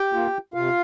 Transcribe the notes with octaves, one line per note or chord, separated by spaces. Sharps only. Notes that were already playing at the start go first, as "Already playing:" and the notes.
Already playing: G4 G5
A#3 F4
C3 F4 F5